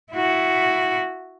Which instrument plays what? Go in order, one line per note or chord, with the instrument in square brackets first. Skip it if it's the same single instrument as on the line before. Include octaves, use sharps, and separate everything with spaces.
[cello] E4 F#4